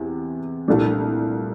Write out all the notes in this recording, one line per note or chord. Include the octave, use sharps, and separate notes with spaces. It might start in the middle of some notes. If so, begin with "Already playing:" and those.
Already playing: E2 C3
C2 A#2 A3 D4